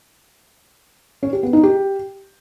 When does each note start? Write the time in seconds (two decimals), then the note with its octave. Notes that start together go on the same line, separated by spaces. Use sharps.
1.23 C#4
1.33 G4
1.43 B3
1.53 D#4
1.63 G4